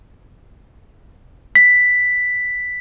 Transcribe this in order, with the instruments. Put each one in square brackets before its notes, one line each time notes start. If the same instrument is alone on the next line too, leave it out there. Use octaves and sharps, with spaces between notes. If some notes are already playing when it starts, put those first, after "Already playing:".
[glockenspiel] B6